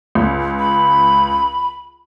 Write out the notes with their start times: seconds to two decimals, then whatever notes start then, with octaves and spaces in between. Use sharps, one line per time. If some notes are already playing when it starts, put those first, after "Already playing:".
0.15 C#2
0.59 B5